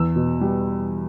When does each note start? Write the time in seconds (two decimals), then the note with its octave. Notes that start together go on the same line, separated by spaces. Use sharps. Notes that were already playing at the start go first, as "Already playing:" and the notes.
Already playing: E2 E6
0.16 B2
0.41 G3